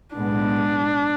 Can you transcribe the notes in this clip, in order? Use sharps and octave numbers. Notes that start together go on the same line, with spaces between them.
B1 A2 G#3 B3 D4